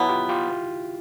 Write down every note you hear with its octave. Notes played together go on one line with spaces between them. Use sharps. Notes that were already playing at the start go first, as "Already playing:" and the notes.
Already playing: B2 F#3 B3 E4 F#4
F4 G4
F4 G4